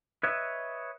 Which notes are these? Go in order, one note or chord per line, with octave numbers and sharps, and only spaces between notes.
B4 C#5 D#5 E5